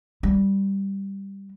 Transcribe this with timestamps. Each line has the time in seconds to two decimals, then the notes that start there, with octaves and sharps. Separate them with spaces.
0.23 G3